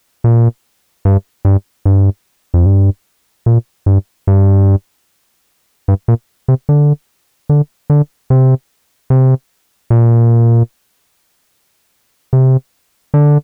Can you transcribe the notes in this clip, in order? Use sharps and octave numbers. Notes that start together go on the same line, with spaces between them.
A#2
G2
G2
G2
F2
G2
A#2
G2
G2
G2
A#2
C3
D3
D3
D3
C3
C3
A#2
C3
D3